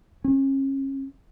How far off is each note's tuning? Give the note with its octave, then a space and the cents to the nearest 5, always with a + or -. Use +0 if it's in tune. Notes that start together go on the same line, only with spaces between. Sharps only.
C#4 -35